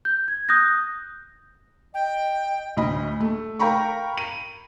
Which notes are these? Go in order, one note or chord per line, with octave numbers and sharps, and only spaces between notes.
G6
G#6
D#6 F#6 G6 A#6
D#5 G5
D2 A2 D#5 B5
A3
A#4 F5 G5 A#5 B5 C#6
D#7